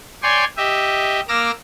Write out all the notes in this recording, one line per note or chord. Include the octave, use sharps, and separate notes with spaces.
C#5 D5 G5 G#5 C6
G4 D#5 E5
A#3 D6 E6 F6 A#6